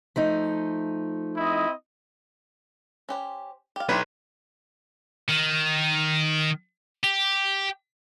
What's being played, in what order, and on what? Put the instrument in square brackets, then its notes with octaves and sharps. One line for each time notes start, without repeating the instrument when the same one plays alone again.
[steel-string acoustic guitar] F3 A3 D#4
[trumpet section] C4 E4 D#5
[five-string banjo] C#4 G4 C5
G4 F5
[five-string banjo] D4 E4 G4 [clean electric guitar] B4 C#5 B5
[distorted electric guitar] D#3
G4